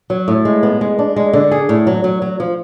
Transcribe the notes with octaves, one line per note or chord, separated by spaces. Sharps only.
F#3
A2
G#3
B3
G#3
D4
G#3
D3
G#4
A2
F#3
F#3
F#3
F3